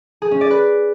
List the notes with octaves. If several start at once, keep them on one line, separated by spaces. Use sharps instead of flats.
G#4
C#4
D5
B4